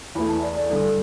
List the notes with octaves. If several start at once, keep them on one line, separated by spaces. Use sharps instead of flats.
E2 E3 A3 E4 B5
A5
D5
D5
G2 D3 G3 A4
A4